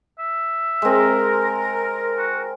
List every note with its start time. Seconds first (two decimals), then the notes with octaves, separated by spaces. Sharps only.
0.19 E5
0.82 G#3 C4 A#4
2.18 F#4